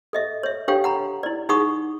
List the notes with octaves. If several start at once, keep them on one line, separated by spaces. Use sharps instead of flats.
A4 D#5 E5
C#5 E5
D4 G4 A4 C#5 F5 G5
F#5 A#5 B5
E4 D5
D#4 G#4 F#5 B5 C#6 D#6